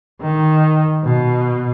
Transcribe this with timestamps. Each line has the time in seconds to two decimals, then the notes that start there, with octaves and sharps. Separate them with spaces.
0.21 D#3
1.04 B2